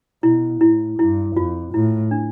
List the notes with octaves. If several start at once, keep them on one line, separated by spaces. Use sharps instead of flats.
B2 E4
A2 E4
G2 E4
F2 F4
A2 E4
D4